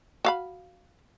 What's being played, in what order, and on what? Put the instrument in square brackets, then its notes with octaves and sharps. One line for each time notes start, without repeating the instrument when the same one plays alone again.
[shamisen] F#4 F5 B5